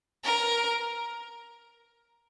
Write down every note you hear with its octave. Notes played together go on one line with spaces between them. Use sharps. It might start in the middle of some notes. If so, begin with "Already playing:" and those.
A#4